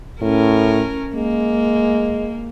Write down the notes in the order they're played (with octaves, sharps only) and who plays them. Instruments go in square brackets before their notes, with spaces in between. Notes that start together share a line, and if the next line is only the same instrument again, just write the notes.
[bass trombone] A2 [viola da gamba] C#4 A#4
[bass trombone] G#3 [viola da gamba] A#3